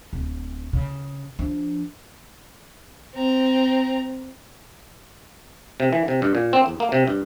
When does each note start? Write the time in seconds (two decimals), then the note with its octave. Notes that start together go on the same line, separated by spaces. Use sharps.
0.13 D1
0.73 C#3
1.39 F3 D4
3.14 C4 A#5
5.80 C3
5.93 E3
6.08 C3
6.22 G2
6.35 A#2
6.53 C4
6.66 E2
6.80 A#3
6.92 C3
7.07 G2